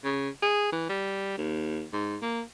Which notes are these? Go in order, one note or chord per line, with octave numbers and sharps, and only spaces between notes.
C#3
G#4
E3
G3
D#2
G#2
A#3